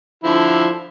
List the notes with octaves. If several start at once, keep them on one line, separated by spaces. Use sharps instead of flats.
D3 F3 E4